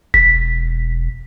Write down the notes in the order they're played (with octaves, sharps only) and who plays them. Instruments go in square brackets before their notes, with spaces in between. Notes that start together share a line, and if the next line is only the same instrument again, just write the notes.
[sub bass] E1 [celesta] B6